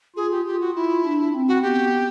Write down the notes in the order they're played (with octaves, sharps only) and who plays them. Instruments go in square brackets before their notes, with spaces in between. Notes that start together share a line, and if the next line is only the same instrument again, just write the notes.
[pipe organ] F4 [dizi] G#4
[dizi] G4
[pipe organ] F4 [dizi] G4
[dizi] F#4
[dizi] E4 [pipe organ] F4
[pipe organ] D4
C4
[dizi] F#4
[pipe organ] B3 [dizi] G4